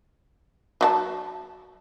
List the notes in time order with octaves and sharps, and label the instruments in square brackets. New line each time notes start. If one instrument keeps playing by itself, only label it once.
[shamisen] F#3 F#4 A5